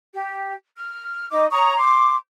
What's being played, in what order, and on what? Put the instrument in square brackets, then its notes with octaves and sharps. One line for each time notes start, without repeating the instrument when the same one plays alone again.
[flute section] G4
F6
D#4 D#5 D6
C#5 A#5 C#6 D#6
C6 D6